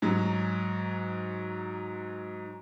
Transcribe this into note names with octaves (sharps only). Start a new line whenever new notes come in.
G#2 F#3